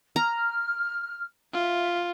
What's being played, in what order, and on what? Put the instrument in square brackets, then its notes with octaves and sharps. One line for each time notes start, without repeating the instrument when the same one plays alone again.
[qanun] A#5 [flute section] F6
[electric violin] F4 [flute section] E5